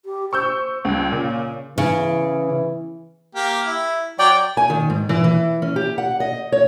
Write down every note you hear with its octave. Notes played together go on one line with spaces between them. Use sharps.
G4
C5 C#6 E6 G6
C#2 G3
A#2 C#3
C#3 E3
A#3 G4
E4
F#3 C#5 D5 G5
G#5
D#3
G#2
E3
E3
C#4
G4
F#5
D#5
C#5